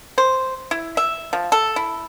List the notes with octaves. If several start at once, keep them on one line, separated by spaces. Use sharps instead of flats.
C5
E4
E5
F3
A4
E4